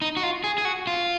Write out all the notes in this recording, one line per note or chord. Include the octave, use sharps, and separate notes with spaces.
D#4
F#4
F4
G#4
G#4
F#4
F4